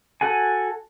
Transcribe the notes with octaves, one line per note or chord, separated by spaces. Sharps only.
F#4 A4 F#5 G#5